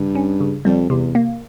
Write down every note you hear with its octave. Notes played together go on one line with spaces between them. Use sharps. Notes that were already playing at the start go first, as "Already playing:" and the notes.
Already playing: G2 C#3
C#4
C#3
F2 G3
E2 C3
A#3